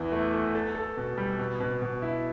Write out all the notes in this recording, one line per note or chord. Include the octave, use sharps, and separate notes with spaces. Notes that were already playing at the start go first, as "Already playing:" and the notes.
Already playing: E2 E3 E4
A3
A3
A4
A4
B2
G3
B2
B2
B2
E4